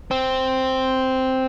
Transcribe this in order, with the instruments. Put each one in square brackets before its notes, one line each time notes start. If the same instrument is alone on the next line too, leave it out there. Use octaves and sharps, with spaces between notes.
[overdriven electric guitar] C4